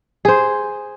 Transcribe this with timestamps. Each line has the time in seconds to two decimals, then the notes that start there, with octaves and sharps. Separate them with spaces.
0.25 G#4 C5